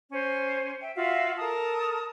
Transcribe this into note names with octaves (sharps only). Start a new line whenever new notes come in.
C#4 C5
E5 G5
F4 F#4 E5 F5
A4 A#4 A5 D#6